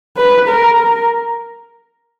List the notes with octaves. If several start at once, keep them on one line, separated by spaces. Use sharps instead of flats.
B4
A#4
A#4